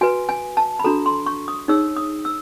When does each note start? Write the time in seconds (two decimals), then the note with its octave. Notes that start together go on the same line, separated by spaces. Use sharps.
0.01 F#4 B4 G#5
0.29 G#5
0.57 A5
0.79 B5
0.84 D4 F#4 A4 A#5
1.06 C6
1.26 C#6
1.48 D#6
1.68 D#4 G#4 C#5 E6
1.97 D#6
2.25 E6